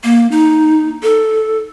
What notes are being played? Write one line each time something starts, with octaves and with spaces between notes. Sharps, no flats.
A#3
D#4
A4